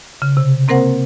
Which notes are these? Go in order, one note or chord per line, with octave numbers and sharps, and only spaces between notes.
C#3
C3
A#3 C4 A#4 C5 F#5